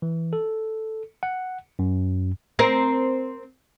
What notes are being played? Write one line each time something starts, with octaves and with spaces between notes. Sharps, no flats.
E3
A4
F#5
F#2
C4 A#4